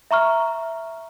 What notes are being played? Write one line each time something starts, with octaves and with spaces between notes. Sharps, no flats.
E5 A#5 C#6 F6